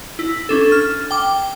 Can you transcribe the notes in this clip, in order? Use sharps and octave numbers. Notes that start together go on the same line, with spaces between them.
E4
C#4 D4 A4
F6
G5 D6